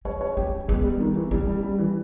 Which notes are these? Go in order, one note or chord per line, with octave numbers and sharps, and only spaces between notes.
C#4 C#5
C#5
C#4 G4
G#3 B3
G3
D#3
E3
G3 C#4
G3
G3
E3